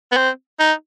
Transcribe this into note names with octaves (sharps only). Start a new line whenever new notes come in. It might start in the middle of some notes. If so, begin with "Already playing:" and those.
B3
C4
D#4